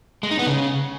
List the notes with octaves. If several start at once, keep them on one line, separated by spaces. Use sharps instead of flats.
G#3
D#4
B3
C#3